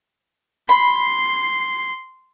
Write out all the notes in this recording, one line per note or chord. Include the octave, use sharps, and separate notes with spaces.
B5 C6 C7